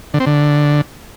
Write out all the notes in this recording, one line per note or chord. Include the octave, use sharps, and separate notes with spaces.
D3
C4
D3